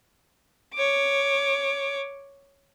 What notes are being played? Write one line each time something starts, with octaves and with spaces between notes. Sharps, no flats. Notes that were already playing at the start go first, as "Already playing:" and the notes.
C#5 D6